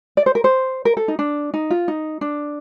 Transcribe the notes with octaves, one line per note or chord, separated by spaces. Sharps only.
D5
C5
A#4
C5
A#4
A4
D#4
D4
D#4
F4
D#4
D4